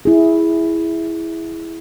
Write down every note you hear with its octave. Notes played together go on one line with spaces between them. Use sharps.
E4 G#4